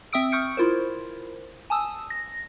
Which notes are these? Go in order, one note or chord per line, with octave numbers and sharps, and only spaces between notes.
C4 E5 G5 D#6 E6 D7
C#6 D#6 F6 G6 C#7 D7
E4 F4 A#4 C5
G#5 A5 D#6 E6
A#6